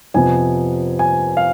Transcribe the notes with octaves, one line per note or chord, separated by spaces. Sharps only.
F2 C3 F3 B3 G#5
G#5
F5